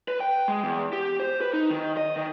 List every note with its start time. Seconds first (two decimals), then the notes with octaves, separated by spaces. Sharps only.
0.08 B4
0.20 G5
0.48 G#3
0.63 E2
0.93 G4
1.20 C5
1.41 B4
1.53 D#4
1.71 D#3
1.97 D#5
2.16 D#3